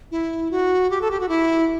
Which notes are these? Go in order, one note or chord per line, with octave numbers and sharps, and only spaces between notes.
E4
F#4
G4
A4
G4
F#4
E4